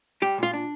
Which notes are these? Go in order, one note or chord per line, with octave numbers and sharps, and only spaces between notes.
G3 G4
A#2 F4
D4